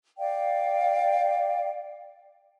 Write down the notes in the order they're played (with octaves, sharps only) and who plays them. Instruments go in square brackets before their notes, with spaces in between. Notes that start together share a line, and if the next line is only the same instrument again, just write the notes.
[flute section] D5 F5 G5